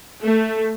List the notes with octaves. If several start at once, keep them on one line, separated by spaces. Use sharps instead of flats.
A3